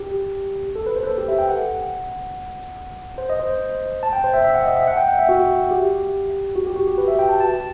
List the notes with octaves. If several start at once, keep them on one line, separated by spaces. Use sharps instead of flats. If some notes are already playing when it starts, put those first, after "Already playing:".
Already playing: G4
A4
B4
C5
B4
A4
G4
E5
G5
F#5
C5
D#5
C5
A5
G5
C5
E5
E5
F#5
D#5
E5
F#5
G5
F#5
E5
F#4
G4
F#4
G4
F#4
G4
B4
E5
G5
A5
A5